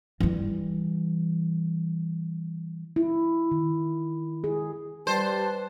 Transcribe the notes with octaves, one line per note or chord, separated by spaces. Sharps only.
E3 G3
E4
D#3
G#4
G3 B4 C5 A5